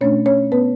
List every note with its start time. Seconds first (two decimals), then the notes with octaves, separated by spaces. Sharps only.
0.01 B2 A3 C#4 D4 C#5
0.26 C#4 C#5
0.52 B3 B4